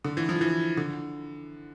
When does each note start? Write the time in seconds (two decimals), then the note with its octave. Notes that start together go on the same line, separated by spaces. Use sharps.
0.05 D3
0.17 E3
0.29 F3
0.41 E3
0.77 D3